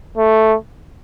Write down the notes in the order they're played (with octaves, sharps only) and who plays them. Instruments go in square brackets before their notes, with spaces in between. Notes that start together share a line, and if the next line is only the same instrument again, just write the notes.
[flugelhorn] A3